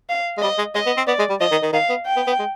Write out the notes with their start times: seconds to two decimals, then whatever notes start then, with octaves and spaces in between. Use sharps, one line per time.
0.09 F5
0.38 G#3
0.42 G3 D#5
0.58 G#3
0.75 G#3 D#5
0.86 B3
0.97 C4
1.07 B3 D5
1.19 G#3
1.30 G3
1.40 F3 D#5
1.51 D#3
1.63 D#3
1.73 D#3 F5
1.89 B3
2.06 G5
2.16 B3
2.27 B3
2.39 G#3